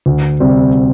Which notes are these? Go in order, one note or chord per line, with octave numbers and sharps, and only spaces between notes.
D2
C3 G3 C4